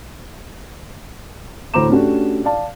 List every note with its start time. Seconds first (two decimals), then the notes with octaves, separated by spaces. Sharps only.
1.74 D2 A2 C5 A#5 D6 E7
1.89 A3 C#4 D4 F#4 G4
2.44 D5 F5 A5